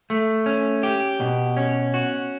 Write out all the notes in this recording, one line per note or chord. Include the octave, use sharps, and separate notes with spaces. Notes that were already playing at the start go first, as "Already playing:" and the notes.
A3
C#4
G4
B2
C#4
F#4